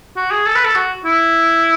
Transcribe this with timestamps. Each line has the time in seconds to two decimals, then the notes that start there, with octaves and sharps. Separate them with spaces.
0.16 F#4
0.31 G#4
0.46 A4
0.56 B4
0.65 A4
0.75 F#4
1.05 E4